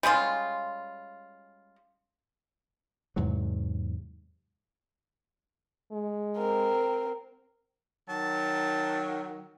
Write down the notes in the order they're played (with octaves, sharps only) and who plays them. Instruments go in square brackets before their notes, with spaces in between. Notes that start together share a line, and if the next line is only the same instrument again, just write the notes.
[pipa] G3 G#3 C#4 F4
[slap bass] E2 G#2 C3 F#3
[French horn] G#3
[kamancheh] C4 A#4
[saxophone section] D#3 F#3 [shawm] A5